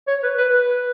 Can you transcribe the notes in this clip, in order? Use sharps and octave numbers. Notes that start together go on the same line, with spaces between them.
C#5
B4
B4
B4